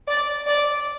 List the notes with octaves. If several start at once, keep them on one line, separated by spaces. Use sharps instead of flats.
D5
D5